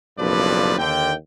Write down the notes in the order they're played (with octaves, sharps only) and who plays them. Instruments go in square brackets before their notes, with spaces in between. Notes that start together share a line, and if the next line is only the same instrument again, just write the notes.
[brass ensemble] F#1 B1 G2 F3 B4 D5
D#2 D3 G5